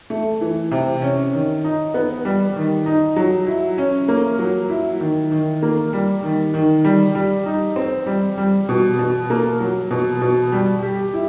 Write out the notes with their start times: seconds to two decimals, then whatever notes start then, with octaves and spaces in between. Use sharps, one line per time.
0.10 A3
0.41 E3
0.71 C3
1.02 C#4
1.33 D#3
1.64 D#4
1.94 B3
2.25 G3
2.56 D#3
2.86 D#4
3.16 F#3
3.47 E4
3.78 C#4
4.08 A#3
4.39 F#3
4.69 E4
5.00 D#3
5.31 D#3
5.62 A#3
5.93 G3
6.23 D#3
6.54 D#3
6.84 G3
7.15 G3
7.46 D#4
7.76 C4
8.06 G3
8.38 G3
8.69 B2
8.99 B2
9.30 A#3
9.60 F#3
9.91 B2
10.21 B2
10.52 G3
10.82 G4
11.14 E4